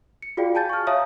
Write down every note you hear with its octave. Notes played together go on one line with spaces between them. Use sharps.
C#7
F4 F#4 G#4 D5 F5 G5
G#5 A5 G6 A6
C#6 F6
C#5 E5 F5 A5 A#5 D#6